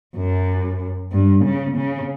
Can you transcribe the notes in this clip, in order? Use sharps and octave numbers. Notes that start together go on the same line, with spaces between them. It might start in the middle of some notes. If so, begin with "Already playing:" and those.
F#2
G2
C#3
C#3